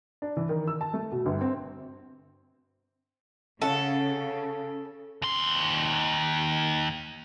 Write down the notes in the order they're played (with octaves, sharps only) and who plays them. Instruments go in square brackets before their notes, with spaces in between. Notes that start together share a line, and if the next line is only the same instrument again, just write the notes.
[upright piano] D4
E3
D#3
E6
A5
A3
B2
G1
C4
[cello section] C#3 [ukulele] C#4 F#5 A5 [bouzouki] A4
[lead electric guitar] D#2 C6